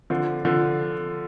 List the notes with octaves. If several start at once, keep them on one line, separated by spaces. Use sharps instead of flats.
D3 F3
D3 F3